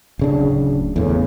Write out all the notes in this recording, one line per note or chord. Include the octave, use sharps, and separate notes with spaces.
D1 C#3 D4
E2 A2 C#3